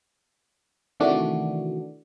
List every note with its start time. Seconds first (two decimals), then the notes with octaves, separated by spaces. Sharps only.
1.00 C3 D#3 E3 A3 D4 F#4